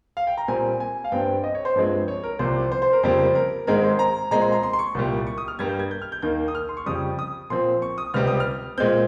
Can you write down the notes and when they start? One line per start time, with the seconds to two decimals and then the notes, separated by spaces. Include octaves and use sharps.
0.17 F5
0.27 G5
0.38 A#5
0.48 A#2 G3 C4 G#5
0.80 G#5
1.04 F5
1.12 G2 G3 C4 G5
1.44 D#5
1.55 C#5
1.65 C5
1.76 G2 F3 G#3 C4
2.08 C#5
2.24 A#4
2.39 C2 C3 F3 C5
2.72 C5
2.82 C5
2.93 A#4
3.03 F2 C#3 G3 A#3 C5
3.35 A#4
3.67 G#2 D#3 G#3 C4 A#4
3.83 C5
3.99 A#5
4.31 A#2 G#3 C4 A#5
4.42 C6
4.52 A#5
4.63 C6
4.73 C6
4.79 C#6
4.95 C2 A#2 G3
5.27 C#6
5.38 D#6
5.48 F6
5.59 G2 G3 A#3 G#6
5.69 G6
5.79 G#6
5.91 G6
6.02 F6
6.12 G6
6.22 D#2 D#3 A#3 G6
6.48 D#6
6.55 F6
6.69 C6
6.77 C#6
6.86 F2 C#3 G3 D#6
7.19 D#6
7.50 A#2 F3 C4 C6
7.82 C#6
7.98 D#6
8.14 C#2 C3 G3 F6
8.27 D#6
8.40 F6
8.78 A#2 G#3 C4 G6